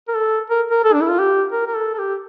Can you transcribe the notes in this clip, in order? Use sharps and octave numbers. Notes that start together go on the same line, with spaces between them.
A#4
A4
A#4
A#4
A4
D4
E4
F4
G4
A#4
A#4
A4
A4
G4